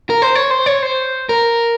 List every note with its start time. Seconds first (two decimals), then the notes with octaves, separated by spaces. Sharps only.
0.10 A#4
0.22 C5
0.35 C#5
0.51 C5
0.66 C#5
0.82 C5
1.29 A#4